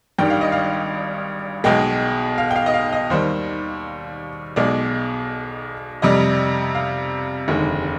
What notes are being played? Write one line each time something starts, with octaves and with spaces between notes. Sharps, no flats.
G#1 G2 D#3 G3 G5
F5
D#5
F5
B1 B2 G#3 G5
F5
G5
F5
D#5
F5
D#5
D#2 D#3 G3 C5
B1 B2 G#3 D5
F2 C3 G3 D#5
F5
F1 D#2 D3 G#3